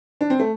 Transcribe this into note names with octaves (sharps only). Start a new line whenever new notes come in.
D4
C4
A3